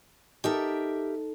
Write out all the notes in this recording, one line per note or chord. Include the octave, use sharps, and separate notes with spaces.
D#4 G4 A4 A#4 E5